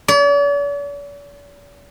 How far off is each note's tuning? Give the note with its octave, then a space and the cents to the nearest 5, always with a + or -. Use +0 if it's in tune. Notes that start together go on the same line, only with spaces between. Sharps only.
D5 -45